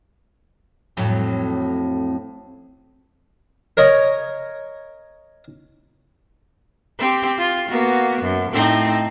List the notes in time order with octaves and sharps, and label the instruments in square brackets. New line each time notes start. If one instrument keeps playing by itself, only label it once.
[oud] F2 A2 F#3
[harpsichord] A#4 C#5 D#5
[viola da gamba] C4 G4
F4
A#3 B3 F#4
F#2
A2 C4 D#4